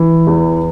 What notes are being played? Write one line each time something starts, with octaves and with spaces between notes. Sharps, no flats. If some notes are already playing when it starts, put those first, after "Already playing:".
Already playing: E3
E2